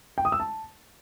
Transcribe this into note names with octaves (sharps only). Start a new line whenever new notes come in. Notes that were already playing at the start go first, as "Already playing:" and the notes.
G5
D#6
E6
A5